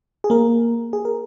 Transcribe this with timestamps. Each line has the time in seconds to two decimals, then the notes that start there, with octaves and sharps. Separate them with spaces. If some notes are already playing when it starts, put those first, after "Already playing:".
0.24 G#4
0.30 A#3 A#4
0.93 G#4
1.05 A#4